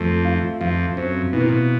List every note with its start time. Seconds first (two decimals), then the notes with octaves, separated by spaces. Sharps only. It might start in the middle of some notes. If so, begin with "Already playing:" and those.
Already playing: F2 A3
0.25 F4
0.60 F2 F4
0.97 F#2 C4
1.33 B2 E3
1.41 A#2
1.49 B2